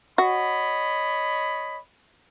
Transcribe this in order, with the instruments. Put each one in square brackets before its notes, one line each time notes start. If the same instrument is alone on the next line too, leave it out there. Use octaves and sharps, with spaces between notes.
[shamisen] F#4 [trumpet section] C#5 D#5 B5